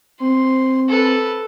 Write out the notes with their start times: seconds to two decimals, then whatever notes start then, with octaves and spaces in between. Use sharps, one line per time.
0.20 C4 C6
0.89 A4 B4